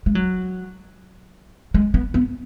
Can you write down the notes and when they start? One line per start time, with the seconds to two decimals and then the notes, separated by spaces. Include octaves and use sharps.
0.06 G#3
0.15 F#3
1.74 G#3
1.94 B3
2.14 B3